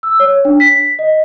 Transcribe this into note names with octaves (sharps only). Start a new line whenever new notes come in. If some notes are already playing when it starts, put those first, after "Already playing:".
E6
C#5
D4
B6
D#5